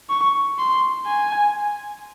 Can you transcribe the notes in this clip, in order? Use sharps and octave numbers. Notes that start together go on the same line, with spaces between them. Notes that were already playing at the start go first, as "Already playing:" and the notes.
C#6
C6
G#5